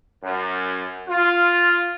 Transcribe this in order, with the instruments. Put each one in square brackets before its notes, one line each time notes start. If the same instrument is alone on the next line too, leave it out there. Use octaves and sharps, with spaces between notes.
[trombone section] F#2
F4